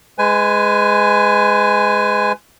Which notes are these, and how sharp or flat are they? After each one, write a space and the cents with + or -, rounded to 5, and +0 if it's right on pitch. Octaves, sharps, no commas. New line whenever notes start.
G#3 +0 B4 +35 G#5 +0